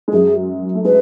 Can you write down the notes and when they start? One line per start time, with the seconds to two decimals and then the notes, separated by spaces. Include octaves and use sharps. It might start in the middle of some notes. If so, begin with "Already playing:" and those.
0.08 G#3
0.13 F#2 F#3 G#4
0.75 A3
0.85 G#3 B4